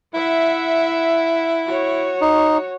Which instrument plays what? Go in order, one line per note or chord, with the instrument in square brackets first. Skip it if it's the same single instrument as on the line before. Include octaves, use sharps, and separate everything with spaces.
[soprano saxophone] E4 [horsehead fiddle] E5 F#5
[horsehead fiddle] F#4 C#5
[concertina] D#4